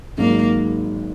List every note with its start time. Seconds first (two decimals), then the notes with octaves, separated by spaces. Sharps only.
0.17 G#1 G#2 F#3 A#3